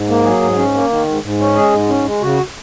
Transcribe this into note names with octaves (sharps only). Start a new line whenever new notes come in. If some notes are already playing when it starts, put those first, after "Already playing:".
Already playing: G#2
A#3
F#3 G#4
G#2
C#4
A#3
D#3
G#2
G#2
C#4
G#3 G#4
G#2
C#4
G#3
C#3 F#4